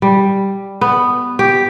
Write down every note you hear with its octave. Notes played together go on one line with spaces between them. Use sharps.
G3
B3
G4